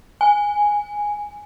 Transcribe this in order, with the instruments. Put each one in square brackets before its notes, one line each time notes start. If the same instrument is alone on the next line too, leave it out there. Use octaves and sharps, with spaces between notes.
[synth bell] G#5